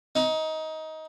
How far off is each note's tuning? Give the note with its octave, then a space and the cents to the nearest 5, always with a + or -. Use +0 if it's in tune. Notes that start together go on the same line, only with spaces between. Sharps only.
D#4 +20